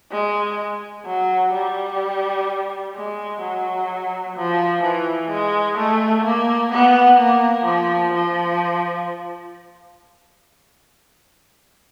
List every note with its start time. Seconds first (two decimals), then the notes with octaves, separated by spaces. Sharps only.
0.11 G#3
1.06 F#3
1.53 G3
2.95 G#3
3.41 F#3
4.36 F3
4.82 E3
5.30 G#3
5.77 A3
6.24 A#3
6.72 B3
7.19 A#3
7.65 F3
8.13 F3